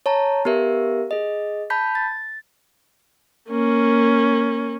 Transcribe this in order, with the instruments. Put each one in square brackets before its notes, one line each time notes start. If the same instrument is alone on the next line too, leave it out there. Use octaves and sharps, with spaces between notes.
[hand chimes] C#5 A5 A#5
B3 G4 A#4 E5
G#4 D#5
A5 B5 G6 B6
A6
[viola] A#3 C#4